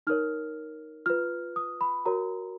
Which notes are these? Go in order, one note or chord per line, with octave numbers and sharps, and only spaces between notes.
D#4 A#4 C#5 F6
F4 B4 F6
D#6
B5
F#4 A#4 C#5 A#5